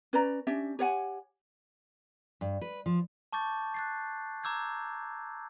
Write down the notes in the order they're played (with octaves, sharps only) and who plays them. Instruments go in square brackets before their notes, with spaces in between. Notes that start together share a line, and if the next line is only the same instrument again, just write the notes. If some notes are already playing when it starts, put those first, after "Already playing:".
[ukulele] C#4 B4 D5 A#5
C#4 D4 G4 E5
G4 C#5 F#5 G#5
[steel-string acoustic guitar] G2
B4
F3
[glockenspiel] A5 C#6 D6 G6 A6
F#6 A6 C7
A#5 D6 E6 G6 G#6